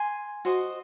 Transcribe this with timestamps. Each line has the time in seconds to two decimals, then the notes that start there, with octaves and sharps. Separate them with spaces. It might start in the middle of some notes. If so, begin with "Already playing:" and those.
Already playing: G#5 C6
0.45 F#4 C5 D#5